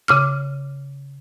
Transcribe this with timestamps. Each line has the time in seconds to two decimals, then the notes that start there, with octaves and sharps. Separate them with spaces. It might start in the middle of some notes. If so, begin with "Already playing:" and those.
0.08 C#3 D6 F6